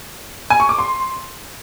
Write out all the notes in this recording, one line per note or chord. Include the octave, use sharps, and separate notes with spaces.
G#5
C#6
D6
C6